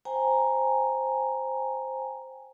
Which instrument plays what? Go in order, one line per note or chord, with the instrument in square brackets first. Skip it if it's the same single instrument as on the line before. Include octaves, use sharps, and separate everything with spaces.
[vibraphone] C5 G5 G#5 A#5